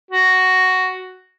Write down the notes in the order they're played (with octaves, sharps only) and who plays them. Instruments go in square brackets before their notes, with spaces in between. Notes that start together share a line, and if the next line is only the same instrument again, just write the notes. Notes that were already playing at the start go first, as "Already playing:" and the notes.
[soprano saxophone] F#4